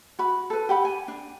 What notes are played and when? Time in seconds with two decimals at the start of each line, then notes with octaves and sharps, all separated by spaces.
0.19 F#4 B5
0.50 A4 B4
0.69 G4 F#5 B5
0.85 G#5
1.08 D4